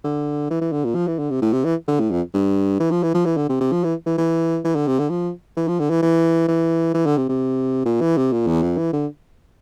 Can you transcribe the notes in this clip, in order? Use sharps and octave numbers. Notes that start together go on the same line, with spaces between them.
D3
E3
E3
D3
A#2
F3
E3
D3
C3
A2
C3
E3
D3
A2
F2
G2
E3
F3
E3
F3
E3
D3
C3
C3
F3
E3
E3
E3
E3
D3
C3
D3
F3
E3
F3
D3
E3
E3
E3
E3
D3
C3
C3
A#2
E3
C3
A#2
E2
F2
E3
D3